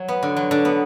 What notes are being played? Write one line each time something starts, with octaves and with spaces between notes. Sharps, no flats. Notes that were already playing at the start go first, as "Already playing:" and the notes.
Already playing: F#3
B3
D3
F#3
D3
B3